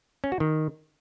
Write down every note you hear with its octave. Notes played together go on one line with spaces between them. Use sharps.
C#4
F#4
D#3